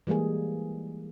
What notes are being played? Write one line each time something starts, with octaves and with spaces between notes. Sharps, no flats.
E3 G3 G#3 A#3 G#4